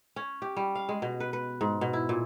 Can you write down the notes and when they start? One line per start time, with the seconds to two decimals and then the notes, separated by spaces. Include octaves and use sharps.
0.16 C#4
0.42 G4
0.57 G3
0.75 F5
0.89 G#3
1.02 B2
1.20 B4
1.33 B4
1.61 G#2
1.81 B2
1.93 E4
2.09 A#2